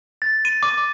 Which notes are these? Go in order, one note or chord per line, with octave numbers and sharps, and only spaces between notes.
A6
D#7
D6